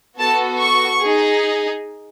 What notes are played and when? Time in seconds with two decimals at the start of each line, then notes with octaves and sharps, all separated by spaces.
0.18 B3 F#4 A4 A5
0.60 C#6
1.02 D#4 G#4